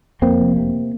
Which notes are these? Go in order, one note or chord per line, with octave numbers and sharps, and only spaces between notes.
F2 A#3 C4
F1
C3